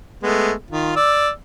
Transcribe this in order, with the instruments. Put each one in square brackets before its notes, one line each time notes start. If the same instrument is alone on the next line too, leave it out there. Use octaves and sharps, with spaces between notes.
[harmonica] G#3 A3 B3
D#3 F4
D5 E6